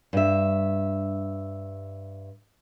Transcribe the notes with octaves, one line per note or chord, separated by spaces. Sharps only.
G2 E5